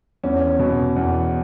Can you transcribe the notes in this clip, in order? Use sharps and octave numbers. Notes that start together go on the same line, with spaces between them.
E2 C#4
B2
E2